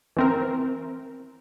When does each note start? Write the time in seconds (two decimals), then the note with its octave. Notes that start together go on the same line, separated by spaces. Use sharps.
0.17 E3 C4 A#4